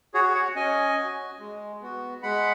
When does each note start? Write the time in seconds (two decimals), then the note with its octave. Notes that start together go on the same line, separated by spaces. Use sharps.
0.14 F#4 G#4 C#5
0.35 C#5 F#5
0.55 C#4 D#5 G#5
0.98 F#4
1.39 G#3
1.81 B3 F#4
2.23 G#3 F#5 B5